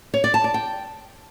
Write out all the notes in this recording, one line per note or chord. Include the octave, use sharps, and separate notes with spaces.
C#5
D5
A5
D5
G5